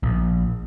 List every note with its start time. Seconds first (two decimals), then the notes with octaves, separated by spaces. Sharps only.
0.03 A#1